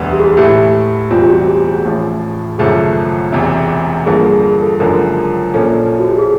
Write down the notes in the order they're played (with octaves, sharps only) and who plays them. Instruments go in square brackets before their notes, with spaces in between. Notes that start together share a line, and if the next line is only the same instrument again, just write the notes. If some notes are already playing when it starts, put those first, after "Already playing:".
Already playing: [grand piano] E1 D2 D3 G3 B3
[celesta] G4
G#4
G4
[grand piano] A2 E3 A3 [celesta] G4
[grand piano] E1 E2 B2 G3 C4 [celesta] F4
[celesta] G4
F#4
G4
G#4
[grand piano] A1 A2 F3
[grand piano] G#1 F#2 C#3 F3 A3 [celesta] G#4
[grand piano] E1 E2 C3
[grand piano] G2 D3 F3 A#3 [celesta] G#4
[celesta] G#4
G#4
A4
[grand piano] F#1 F#2 D3 F3 G#3 [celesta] A#4
[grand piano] A#1 A#2 F3 A#3 C#4 [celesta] A4
[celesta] F#4
G4
G#4